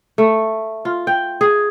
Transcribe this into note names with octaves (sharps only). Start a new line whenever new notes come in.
A3
F4
G5
G#4